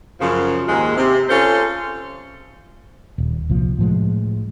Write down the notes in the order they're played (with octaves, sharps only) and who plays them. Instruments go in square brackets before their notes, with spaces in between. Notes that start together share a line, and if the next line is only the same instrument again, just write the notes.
[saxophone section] F#2 C#3 F3
D#2 G#2 G#3
C3
C#4 F4 G#4 A4 C5 C#5
[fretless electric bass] D#1
C2 A#2 F3
A2 F3 G#3